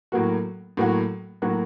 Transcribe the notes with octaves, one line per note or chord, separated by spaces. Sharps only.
A2 F#3 A#3 F#4
A2 F#3 A#3 F#4
A2 F#3 A#3 F#4